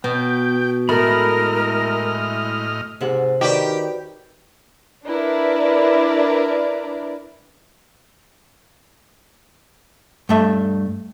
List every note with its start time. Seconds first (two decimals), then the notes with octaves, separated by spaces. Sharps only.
0.04 B2 B3 G5
0.89 A2 G#3 A3 E4 A#4 D#5 B5 F6
3.01 G#2 C3 F#5
3.41 D#3 D#4 F#4 G4 B4 D5
5.06 D4 E4 A#4 B4 D5
10.29 G2 A3 E5